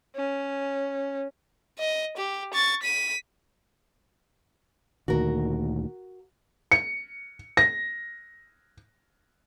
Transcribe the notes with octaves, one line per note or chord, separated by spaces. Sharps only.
C#4
D#5
G4
C#6 A6
B6 D#7
D2 A#2 D#3 F#4 A#4
C#7
A#6